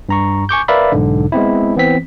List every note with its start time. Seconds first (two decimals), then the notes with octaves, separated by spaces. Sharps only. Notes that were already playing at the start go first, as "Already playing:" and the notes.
0.09 G2 A#5 C#6
0.49 G#5 C#6 D6 G6
0.68 A#4 B4 D5 E5 F5 B5
0.92 B1 G#2 D3
1.32 G#3 B3 C4 E4
1.76 E3 B3 C4 B6